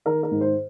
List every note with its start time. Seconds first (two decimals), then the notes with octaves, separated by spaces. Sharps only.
0.05 D#3 A#4
0.23 A#4
0.31 G#2
0.41 C5